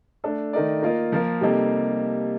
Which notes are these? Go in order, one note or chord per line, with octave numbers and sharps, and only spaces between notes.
A3 D4 A4
D#3 A3 D#4 A#4 D5
A#3 F4 A#4 D#5
F3 A#3 F4 A#4
C3 G3 A#3 D#4 A4